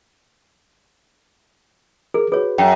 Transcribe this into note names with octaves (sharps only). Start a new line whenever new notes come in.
G#4 A#4
F#4 G#4 B4 C#5
F#2 G5